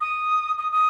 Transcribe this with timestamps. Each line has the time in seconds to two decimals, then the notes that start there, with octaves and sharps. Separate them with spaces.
0.01 D#6
0.58 D#6
0.72 D#6